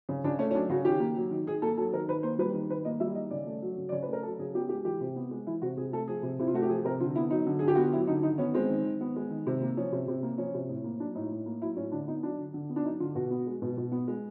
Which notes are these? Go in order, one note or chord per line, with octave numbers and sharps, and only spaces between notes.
C#3
C#3 D4
A3 C#4
C#4
F#3 D4
C#3 F#4
D#3 G4
A#3
F#3
D#3
D#3 G#4
A#3 A4
F#3 A4
D#3 A#4
D#3 B4
A#3 C5
G3 B4
D#3
D#3 B4
A#3 D#5
G3 E5
D#3 D#5
C#3 D5
A3
F#3
C#3
D5
C#3 C#5
B4
A3
A#4
F#3 A4
C#3 G#4
B3 G4
G#3 G4
E3 G4
C3
B3
G#3
E3 E4
C3 F#4
C3 G#4
A3 A4
F3 G#4
C3
C3 E4
F4
A3 F#4
G4
F3 G#4
C3 A#4
D3 F4
B3 E4
F#3 D#4
D3
D3 G#4
G4
B3 F#4
F4
F#3 E4
D3 D#4
D#3 D#4
B3 C#4
G#3 C4
D#3
D#3
B3
G#3
D#3
C3
A#3
F3 C#4
C3
C3
A#3
F3 C#4
C3
A2
A#3
F#3 D4
A2 D#4
A2
A#3
F#3 E4
A2 C#4
D3 D4
B3 D#4
F#3 D4
D3
D3
B3
D4
F#3 D#4
D3 F4
B2 F#4
B3
G#3
B2
B2
B3
G#3